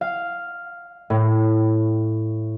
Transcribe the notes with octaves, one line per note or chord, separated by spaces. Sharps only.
F5
A2